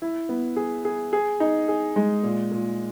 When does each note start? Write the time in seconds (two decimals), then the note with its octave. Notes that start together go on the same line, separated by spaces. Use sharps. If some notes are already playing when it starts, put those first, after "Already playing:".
0.02 E4
0.29 B3
0.56 G#4
0.85 G#4
1.13 G#4
1.40 D#4
1.68 G#4
1.96 G#3
2.23 A#2
2.51 A#2